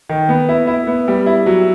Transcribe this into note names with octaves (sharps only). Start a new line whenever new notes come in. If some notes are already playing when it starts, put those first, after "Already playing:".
D#3
B3
E4
E4
B3
G3
E4
F#3